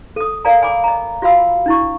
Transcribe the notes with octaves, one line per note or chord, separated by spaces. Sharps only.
A4 D#6
A#4 D5 F5 G#5 A#5
G#5 B5 D6
D#5 A#5
F4 F#4 F5 B5 E6
D4 E4 C#6